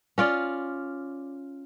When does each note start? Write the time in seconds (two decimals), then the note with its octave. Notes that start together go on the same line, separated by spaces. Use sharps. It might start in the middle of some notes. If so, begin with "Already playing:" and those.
0.18 C#4 F4 D5